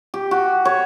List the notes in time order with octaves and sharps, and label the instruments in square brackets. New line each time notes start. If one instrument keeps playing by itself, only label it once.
[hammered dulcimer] G4
F#4
C#5